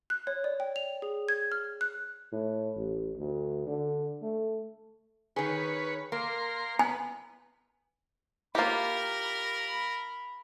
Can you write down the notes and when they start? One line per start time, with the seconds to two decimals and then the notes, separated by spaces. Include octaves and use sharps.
0.10 F#6
0.27 C#5
0.44 D5
0.60 G5
0.76 F7
1.02 G#4
1.29 G#6
1.52 F6
1.81 F#6
2.32 A2
2.76 A1
3.18 D2
3.67 D3
4.22 A3
5.36 D#3 G#4 B4 C#5
6.12 A#3 A#4 C6
6.79 B3 G#5
8.55 A#3 E4 F4 G4 A#4 B5